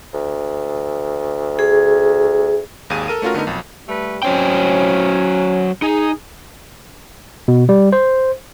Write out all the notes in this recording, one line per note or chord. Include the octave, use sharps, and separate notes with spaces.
D2
G#4
G#1 D#2 G#4 F5 D#7
A4 A#4 D#7
A3 C#4 F4 F#4 A#4
D3 A3 B3 D#4 A#4
B1 F2
G3 A3 B4
F#3 C#4 C5 G5
D#4 G#4
B2
G3
C5